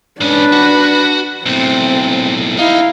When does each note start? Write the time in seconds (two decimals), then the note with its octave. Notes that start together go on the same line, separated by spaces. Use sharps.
0.21 G#2 C#4 D4 B4
0.52 F#4
1.46 B1 A2 C4
2.58 D#4 E4 F5